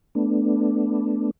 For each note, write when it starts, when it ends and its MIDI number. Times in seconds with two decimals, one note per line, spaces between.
0.15 1.31 57
0.15 1.31 59
0.15 1.31 62